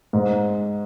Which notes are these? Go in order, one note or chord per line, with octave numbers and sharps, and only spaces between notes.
G#2